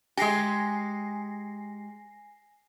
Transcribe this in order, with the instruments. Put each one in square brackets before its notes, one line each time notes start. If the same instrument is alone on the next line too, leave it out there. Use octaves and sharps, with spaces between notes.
[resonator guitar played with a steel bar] G#3 G4 [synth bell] G#5 A#6 C7